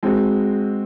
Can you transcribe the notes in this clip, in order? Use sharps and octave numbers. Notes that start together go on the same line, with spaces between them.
G#3 C4 F#4